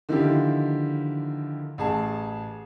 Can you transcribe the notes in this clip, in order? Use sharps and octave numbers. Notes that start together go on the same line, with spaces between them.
D3 D#3 F3 A#3 E4 G4
A1 G#4 A5